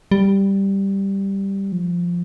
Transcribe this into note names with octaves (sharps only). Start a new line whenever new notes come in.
G3
F3